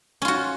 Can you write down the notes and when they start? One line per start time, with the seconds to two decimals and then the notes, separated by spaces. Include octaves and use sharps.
0.22 C#4
0.25 F4
0.28 F#4